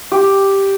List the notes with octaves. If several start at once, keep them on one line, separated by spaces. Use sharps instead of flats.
G4